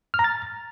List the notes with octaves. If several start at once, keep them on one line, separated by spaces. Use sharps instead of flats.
F6
A#5
A6